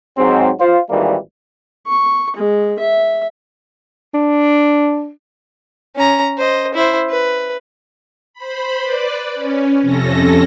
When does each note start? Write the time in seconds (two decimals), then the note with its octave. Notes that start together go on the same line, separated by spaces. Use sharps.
0.18 G#2 F#3 C4
0.59 F4 C5
0.90 G#1 A#2 D#3 E3 G3 A#3
1.87 C#6
2.36 G#3
2.79 E5
4.14 D4
5.96 C#4 A#5
6.38 C5 D#5
6.74 E4 C5
7.10 B4
8.34 C5 B5
8.81 B4 D5
9.34 C#4
9.81 F2 C3 C#4 A4 A#6